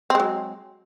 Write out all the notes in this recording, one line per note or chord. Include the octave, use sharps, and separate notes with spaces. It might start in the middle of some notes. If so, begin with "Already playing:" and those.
F#3 G#3 C4